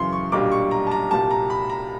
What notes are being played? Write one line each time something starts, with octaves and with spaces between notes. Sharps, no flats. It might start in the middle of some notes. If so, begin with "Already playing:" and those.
Already playing: F#2 C#3 E3 C6
C#6
B1 A#2 G3 A#3 D4 D6
C#6
A#5
A5
A#5
C2 A#2 G3 A5
A#5
B5
A#5